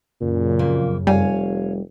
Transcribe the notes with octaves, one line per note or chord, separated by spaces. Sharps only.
F#2 A#2 C#3
F2 A#3
F1 G3 C#5 F5 G#5